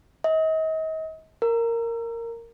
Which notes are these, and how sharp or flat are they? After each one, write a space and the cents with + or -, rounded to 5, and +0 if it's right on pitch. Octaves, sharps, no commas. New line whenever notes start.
D#5 +40
A#4 -10